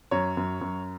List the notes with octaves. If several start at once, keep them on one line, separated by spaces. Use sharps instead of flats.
F#2 C#5
F#2
F#2